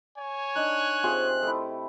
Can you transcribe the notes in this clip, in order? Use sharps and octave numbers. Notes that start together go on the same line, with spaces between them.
C#5 G#5
D4 D#4 F#6
C3 F4 G#4
A3 E4